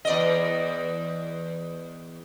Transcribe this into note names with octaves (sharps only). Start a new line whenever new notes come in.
E2 D5 D#5